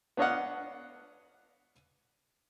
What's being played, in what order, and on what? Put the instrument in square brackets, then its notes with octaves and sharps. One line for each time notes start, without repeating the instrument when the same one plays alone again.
[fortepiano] B3 D4 C#5 D#5 F5 F#5